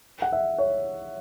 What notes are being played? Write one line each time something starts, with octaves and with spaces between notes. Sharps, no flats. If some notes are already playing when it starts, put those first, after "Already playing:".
F#5
E5
C#5